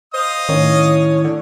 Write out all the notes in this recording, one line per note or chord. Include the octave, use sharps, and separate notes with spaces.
C5 D#5 F5 D#6
A2 D#3 C#4 C#5
D3